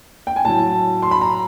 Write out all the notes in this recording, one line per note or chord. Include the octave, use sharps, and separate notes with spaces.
G5
G#5
A2 F#3 A5
C6
B5
A#5